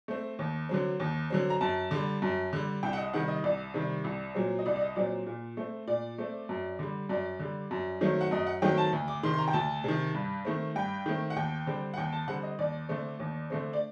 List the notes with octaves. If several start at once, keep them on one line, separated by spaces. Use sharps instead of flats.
A3 C4
D#2
D3 F#3 C4
D#2
D3 F#3 C4
A#5
F#2 A5
D3 G3
F#2
D3 G3
C2 G5
F#5
D#5
C3 D#3 G3 F#5
D#5
C2 D5
C3 D#3 G3
C2
A#2 F#3 C4
D#5
C2 D5
D5
D#5
A#2 F#3 C4 D5
A#2
A3 C4
A#2 D5
A3 C4
F#2
D3 G3
F#2 D5
D3 G3
F#2
D#3 F#3 A3 C4
F#5
F#2 D#5
F#5
D#3 F#3 A3 C4 G5
A5
D2
D6
C3 D#3 C6
C6
A#5
G5
D2 A5
C3 D#3
G2
D#3 A3 C4
G2 G5
D#3 A3 C4
F#5
D#2 G5
D3 G3 C4
F#5
D#2 G5
A5
D3 G3 C4 F#5
D#5
D#2 D5
D3 A3 C4
D#2
D3 A3 C4
D5